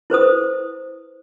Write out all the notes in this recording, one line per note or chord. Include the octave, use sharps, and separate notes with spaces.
E4 B4 C5 D#6